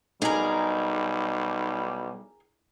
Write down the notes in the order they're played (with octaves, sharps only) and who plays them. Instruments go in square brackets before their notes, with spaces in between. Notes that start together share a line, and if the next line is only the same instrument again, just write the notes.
[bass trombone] B1 [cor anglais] G3 [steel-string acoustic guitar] D#4 [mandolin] G#4 A#4